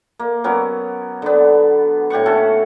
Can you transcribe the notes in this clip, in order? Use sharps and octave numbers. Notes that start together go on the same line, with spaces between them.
A#3
F#3 B3 C#4 A#4
D3 B3
A2 G4 F#5 C#6
C#4 F#4 A4